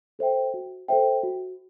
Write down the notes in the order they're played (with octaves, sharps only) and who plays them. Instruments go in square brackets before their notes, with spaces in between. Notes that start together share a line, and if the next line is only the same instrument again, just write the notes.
[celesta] A4 C5 E5 G5
F#4
A4 C5 E5 G5
F#4